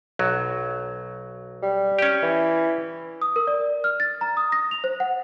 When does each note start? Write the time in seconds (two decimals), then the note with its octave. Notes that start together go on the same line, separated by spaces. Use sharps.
0.19 B1 F#3
1.62 G3
1.99 C#4 G4
2.23 E3
3.22 D#6
3.36 A#4
3.47 D5
3.84 F6
4.00 A6
4.21 A#5
4.37 D#6
4.52 A#6
4.71 F7
4.84 C5
5.00 F#5